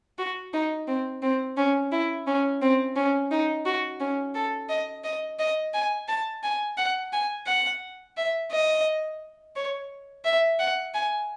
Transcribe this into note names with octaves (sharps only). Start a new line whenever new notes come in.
F#4
D#4
C4
C4
C#4
E4
C#4
C4
C#4
D#4
F#4
C#4
A4
D#5
D#5
D#5
G#5
A5
G#5
F#5
G#5
F#5
E5
D#5
C#5
E5
F#5
G#5